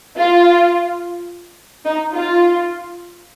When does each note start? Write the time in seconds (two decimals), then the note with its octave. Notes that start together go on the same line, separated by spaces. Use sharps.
0.17 F4
1.86 D#4
2.13 F4